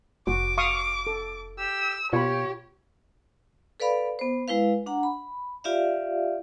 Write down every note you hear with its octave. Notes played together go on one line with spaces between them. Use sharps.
F1 F#4 D6
F5 C#6 D#6
A4
G4 E6
B2 F4 G4 C#5 B5
A4 B4 D5 F5 B5
B3 C5
G#3 E4 B4 F5
D4 F#5 A#5
B5
F4 G4 D5 E5 F5